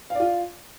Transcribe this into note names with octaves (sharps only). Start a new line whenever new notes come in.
F4 D5 F5